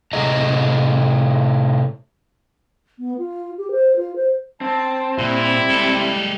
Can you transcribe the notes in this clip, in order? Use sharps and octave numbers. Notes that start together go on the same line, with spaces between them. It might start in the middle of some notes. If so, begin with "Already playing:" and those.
A2 C3 A3 G#4 D#5 A#5
B3
F4
G4
C5
F4
C5
C4 A5
A#2 G3 E4
G#3 A4